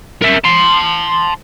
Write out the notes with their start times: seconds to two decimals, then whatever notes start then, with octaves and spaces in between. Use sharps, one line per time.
0.22 A#4 E5
0.44 A5 C6